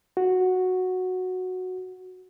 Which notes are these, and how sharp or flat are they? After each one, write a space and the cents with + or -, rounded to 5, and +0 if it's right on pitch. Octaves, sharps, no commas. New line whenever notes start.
F#4 -5